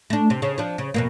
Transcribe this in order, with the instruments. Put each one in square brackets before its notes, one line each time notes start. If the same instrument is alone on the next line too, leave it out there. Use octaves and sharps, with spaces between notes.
[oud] A3 D4
C3
C#3
F3 D4
C#3
F2 B2 A#3